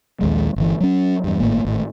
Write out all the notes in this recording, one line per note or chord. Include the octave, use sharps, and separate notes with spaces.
A#1 D#2 G#3
G1 E3
F#3 C#4
E2 G2
G#1 A2 A#3
G#1 A2